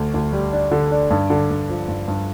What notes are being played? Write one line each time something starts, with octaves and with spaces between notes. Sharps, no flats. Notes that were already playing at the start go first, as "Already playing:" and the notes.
Already playing: D2
D2
G3
D4
D3
D4
G2
D3
G2
F3
G2
G2